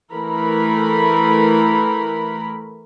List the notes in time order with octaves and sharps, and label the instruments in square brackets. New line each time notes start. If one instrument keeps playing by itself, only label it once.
[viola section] E3 A3 A#4 B5